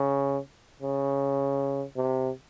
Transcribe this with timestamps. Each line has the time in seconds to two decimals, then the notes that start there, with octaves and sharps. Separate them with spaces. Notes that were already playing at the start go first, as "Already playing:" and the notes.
Already playing: C#3
0.82 C#3
1.96 C3